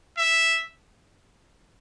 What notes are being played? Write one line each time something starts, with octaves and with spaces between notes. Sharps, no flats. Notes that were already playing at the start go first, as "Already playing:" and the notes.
E5